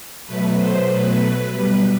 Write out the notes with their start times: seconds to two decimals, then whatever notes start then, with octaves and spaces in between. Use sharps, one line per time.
0.26 B2 F#3 A3 B4
0.57 C5
0.88 B4
1.48 B2 G3